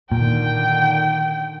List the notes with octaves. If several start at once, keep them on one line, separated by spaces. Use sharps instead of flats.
A#2 D3 D#3 G5